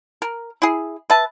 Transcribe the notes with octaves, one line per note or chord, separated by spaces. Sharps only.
A#4
E4 G#4
B4 E5 A5